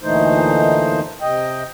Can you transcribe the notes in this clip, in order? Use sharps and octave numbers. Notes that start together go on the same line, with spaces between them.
D2 A#2 E3 A3 D#4 C5
C3 D#5 G5